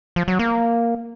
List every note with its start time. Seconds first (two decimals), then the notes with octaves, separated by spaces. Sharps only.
0.16 F3
0.28 F#3
0.39 A#3